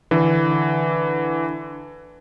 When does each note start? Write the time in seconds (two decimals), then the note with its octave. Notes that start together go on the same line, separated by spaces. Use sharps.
0.11 D3 E3